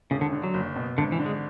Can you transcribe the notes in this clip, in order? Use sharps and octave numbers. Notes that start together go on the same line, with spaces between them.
E1 C#3
D3
D3
F#3
F#1
B2
G#1 D3
E3
D3
G#3